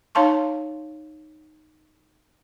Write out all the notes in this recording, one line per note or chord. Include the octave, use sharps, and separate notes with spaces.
D#4 C#5 F5 A5 C6 C#6